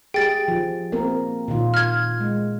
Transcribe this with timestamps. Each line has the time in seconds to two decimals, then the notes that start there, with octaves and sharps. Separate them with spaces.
0.14 G4 G#4 G5 A6 D7
0.48 F3
0.92 A#3 C4 A#4
1.48 A#2 D#3 F4
1.74 F6 G#6
2.20 G#3